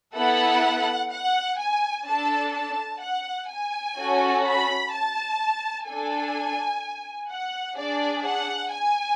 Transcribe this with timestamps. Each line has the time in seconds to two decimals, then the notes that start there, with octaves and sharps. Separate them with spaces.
0.15 B3 E4 A4 F#5
1.11 F#5
1.58 G#5
2.06 D4 A4 A5
2.54 A5
3.02 F#5
3.49 G#5
3.97 C#4 F#4 A4
4.44 B5
4.92 A5
5.87 D4 A4 G#5
7.30 F#5
7.78 D4 G#4 D5
8.25 F#5
8.73 G#5